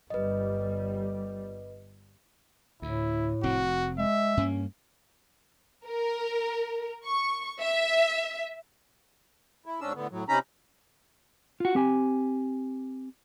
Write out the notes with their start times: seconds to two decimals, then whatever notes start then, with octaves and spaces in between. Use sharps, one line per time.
0.10 G1 G3 B4 D#5
2.82 D2 A2 E4
3.43 F1 C4 F#4
3.98 G#3 E5
4.37 G2 A#3 C#4
5.87 A#4
7.06 C#6
7.61 E5
9.66 E4
9.81 G#2 C#4 D4 E6
9.95 A2 D3 B3
10.11 A2 F#3
10.29 C3 C#4 D#4 A#5 B5
11.60 F4 F#4
11.75 C4 G4 G#5